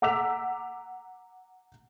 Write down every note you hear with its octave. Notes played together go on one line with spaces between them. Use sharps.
F#5 A#5 D6 E6 B6 F7